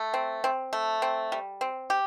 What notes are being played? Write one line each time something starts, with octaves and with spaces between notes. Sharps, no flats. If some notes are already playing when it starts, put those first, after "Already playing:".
Already playing: A3
C4
C4
A3
C4
G3
C4
G4